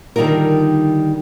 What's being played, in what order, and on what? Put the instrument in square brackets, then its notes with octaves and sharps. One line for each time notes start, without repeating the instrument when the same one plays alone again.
[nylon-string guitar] D3 D#3 G3 D#4 F4 A#4